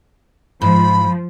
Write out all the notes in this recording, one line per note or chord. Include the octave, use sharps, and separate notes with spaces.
G#2 F3 B5